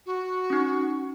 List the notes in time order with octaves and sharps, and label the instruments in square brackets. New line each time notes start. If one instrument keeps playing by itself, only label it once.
[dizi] F#4
[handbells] C#4 D#4